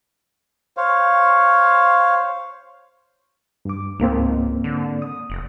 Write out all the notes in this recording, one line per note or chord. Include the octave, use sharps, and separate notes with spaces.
C5 C#5 F5
G2 D6
C#2 G#2 A#3 C4
D3
D#6
F1